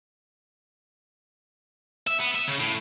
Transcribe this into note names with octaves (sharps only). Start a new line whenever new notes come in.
E5
B3
E5
C#3
A2